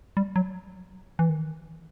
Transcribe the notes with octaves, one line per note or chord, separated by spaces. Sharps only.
G3
F#3
E3
D#3